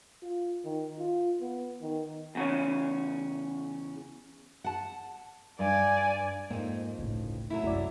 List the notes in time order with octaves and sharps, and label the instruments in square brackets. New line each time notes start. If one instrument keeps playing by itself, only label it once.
[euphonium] F4
D#3
F4
B3
D#3
[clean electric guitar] E2 C#3 C#4
[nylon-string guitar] F#5 A5
[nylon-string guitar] G2 [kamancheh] D5 G#5
[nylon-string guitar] F2 D#4 [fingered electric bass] G#2 [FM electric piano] A#3
[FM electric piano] G1 A2 [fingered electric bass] C#2
[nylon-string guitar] F#3 A3 E4
[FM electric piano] G1 C2 D5 [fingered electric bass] F#2